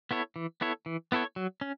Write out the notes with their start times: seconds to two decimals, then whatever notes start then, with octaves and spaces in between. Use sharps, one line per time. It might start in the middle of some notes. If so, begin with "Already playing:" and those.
0.11 B3 E4 A4 C#5
0.36 E3
0.61 B3 E4 A4 C#5
0.86 E3
1.12 B3 E4 A4 C#5
1.36 F#3
1.61 C#4